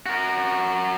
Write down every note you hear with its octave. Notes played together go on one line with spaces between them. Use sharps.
F#4 A#4